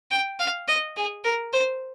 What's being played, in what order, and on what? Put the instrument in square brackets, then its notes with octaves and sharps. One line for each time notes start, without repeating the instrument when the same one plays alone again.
[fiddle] G5
F5
D#5
G#4
A#4
C5